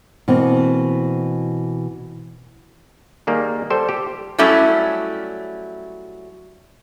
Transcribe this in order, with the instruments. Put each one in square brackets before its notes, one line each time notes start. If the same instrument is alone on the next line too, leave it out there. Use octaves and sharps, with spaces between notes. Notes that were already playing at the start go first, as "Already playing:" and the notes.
[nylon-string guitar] B2 E3 A#3 C4
[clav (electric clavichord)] D#3 G3 A#3 G#4
G3 A4 C5 G5
G4
[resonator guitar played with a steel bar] F#3 G3 A3 C#4 E4